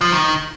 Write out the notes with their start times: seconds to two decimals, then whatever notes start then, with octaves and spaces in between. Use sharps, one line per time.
0.01 F3
0.12 D#3